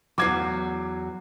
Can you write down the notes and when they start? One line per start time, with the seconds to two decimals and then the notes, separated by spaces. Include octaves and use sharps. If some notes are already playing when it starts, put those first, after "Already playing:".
0.18 E2 G2 F#3 D6 G#6 C7